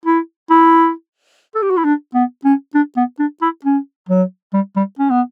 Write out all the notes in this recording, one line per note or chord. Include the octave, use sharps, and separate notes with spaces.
E4
E4
A4
G4
F#4
E4
D4
B3
C#4
D4
B3
D4
E4
C#4
F#3
G3
G3
C#4
B3